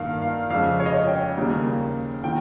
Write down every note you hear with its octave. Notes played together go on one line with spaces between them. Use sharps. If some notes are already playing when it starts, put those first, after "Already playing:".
Already playing: G2 D#3 A#3 F5
F5
F2 C#3 G#3 F5
C#5
D#5
C#5
G5
D#2 C#3 G3 A#3
D#3 A#3 G5